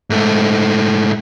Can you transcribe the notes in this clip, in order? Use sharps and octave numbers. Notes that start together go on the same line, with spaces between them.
G#2 A3